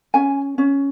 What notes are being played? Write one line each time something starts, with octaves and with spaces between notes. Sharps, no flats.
C#4 G#5
C#4